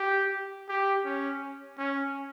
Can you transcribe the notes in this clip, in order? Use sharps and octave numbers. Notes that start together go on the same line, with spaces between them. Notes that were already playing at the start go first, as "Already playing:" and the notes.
Already playing: G4
G4
C#4
C#4